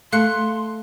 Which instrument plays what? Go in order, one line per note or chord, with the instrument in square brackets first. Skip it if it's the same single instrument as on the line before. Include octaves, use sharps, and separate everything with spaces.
[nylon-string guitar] A3 [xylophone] F5 F#6 C#7 [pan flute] C6